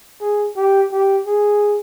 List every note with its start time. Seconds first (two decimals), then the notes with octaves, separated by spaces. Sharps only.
0.21 G#4
0.56 G4
0.92 G4
1.27 G#4